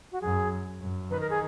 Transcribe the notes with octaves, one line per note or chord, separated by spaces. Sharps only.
F#4
F#2 G#4
F#2
D#3 B4
A#4
G#4